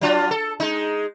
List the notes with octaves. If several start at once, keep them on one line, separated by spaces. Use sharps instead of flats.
F#3 D4 F4
A4
G#3 D#4